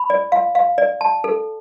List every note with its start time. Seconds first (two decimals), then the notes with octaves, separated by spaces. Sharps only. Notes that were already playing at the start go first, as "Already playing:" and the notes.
Already playing: B5
0.10 D5
0.32 F5
0.55 F5
0.78 D5
1.01 A5
1.24 A4